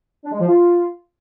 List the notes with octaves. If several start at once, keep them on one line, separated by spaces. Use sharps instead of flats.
D4
G#3
F3
F4